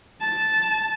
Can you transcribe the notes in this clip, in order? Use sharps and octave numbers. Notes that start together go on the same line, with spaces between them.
A5